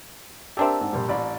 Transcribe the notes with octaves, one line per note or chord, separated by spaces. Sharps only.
C4 D4 G4 A4 A#4 E5
G#2
A#1 G3
A1 D5 B5